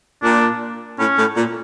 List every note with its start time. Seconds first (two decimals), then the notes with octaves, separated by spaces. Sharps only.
0.23 A#2 D4
0.99 A2 C#4
1.17 A2
1.36 A#2